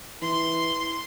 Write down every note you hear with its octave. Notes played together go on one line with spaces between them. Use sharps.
E3 C6